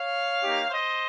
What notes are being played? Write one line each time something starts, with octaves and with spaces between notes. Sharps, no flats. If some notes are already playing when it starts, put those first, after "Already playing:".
Already playing: C#5 F5
A#3 D#4 G4
C5 D#5